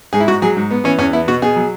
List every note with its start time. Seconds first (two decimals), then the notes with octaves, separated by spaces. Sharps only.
0.13 G#2 G#4
0.20 E4
0.28 G#2 F#4
0.42 F#3 G#4
0.57 G#2
0.71 B3
0.84 E3 C#4
0.99 E2 C#4
1.13 B3 E4
1.28 B2 F#4
1.42 B2 G#4
1.56 F#3